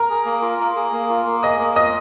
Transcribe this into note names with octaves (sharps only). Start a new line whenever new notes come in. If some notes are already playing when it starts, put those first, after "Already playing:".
Already playing: A#4 A#5
G#4
A#3
F4
A#3
G#4
A#3
F4
A#3
G#4 D#5 D#6
A#3
F4 D#5 D#6